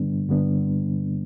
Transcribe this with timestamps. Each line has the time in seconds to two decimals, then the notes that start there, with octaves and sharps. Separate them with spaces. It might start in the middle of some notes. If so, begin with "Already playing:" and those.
Already playing: G2 D3 G3 B3 D4
0.29 G2 D3 G3 B3 D4